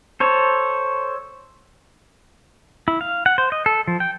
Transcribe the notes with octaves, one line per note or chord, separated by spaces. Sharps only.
A4 C5 C#5
E4
F5
F#5
C5
D#5
A4
F3
G5